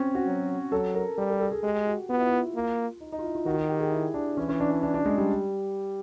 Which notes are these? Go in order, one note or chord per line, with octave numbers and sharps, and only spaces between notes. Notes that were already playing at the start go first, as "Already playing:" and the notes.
Already playing: C4 C#4
F#4
F#3
F#3 A4
A#4
G3 A4
A4
A4
G#4
G#3 G4
F#4
B3 F4
E4
F4
A#3
D#4
D#4
F4
E4
F4
D#3 F#4
F#4
G4
G#4
E4
D4
E3 C#4
C#4
D4
D4
D4
D4
G#3
G3